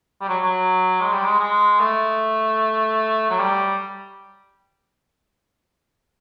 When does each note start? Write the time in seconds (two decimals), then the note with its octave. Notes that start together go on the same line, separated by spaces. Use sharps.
0.21 G3
0.29 F#3
0.43 F#3
1.01 G#3
1.13 G3
1.25 G#3
1.40 G#3
1.80 A3
3.30 F#3
3.40 G3